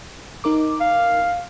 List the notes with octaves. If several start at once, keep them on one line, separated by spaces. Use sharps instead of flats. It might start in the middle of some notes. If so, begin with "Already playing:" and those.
D#4 A#4 D6
F5